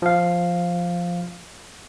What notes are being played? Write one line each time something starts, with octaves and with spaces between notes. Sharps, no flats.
F3 F5